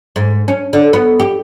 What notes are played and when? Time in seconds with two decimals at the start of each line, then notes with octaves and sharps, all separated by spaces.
0.16 G#2
0.48 C#4
0.73 D3
0.93 B3
1.20 G4